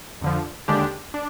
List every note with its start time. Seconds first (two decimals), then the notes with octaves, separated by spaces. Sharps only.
0.21 F2 D3 F3
0.68 D#2 D3 G#3 D4 G4
1.14 D4